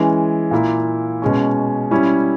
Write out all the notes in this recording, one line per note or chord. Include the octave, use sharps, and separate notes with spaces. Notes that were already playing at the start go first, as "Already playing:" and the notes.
Already playing: E3 G#3 C#4
A#2 A#3 E4
B2 G#3 C#4
G3 C#4 E4